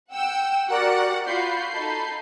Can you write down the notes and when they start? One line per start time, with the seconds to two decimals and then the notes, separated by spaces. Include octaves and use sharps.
0.13 F#5 G5 E6
0.68 F#4 G4 A#4 D5 F#5
1.25 F4 F#4 B5 G6 C7
1.72 D#4 A4